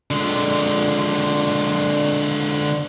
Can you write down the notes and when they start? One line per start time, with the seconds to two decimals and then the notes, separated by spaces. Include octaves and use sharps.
0.11 D3 G#3